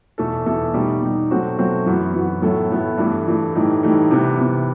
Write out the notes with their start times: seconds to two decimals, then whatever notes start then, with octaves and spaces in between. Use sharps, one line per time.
0.18 E2 B2 A3 E4 A4
0.46 E2 B2 A3 E4 A4
0.74 B2 G3 D#4
1.02 B2 G3 D#4
1.31 B2 F#3 A3 C4 F#4
1.58 B2 F#3 A3 C4 F#4
1.86 F#2 E3 B3 F#4
2.14 F#2 E3 B3 F#4
2.42 A2 F#3 B3 E4 A4
2.71 A2 F#3 B3 E4 A4
2.98 G2 E3 A3
3.27 G2 E3 A3
3.54 A2 E3 G3 D#4 A4
3.82 A2 E3 G3 D#4 A4
4.11 C3 E3 B3
4.39 C3 E3 B3